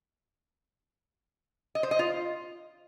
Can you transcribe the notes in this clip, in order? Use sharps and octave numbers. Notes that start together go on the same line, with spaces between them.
D#5
C5
D#5
F4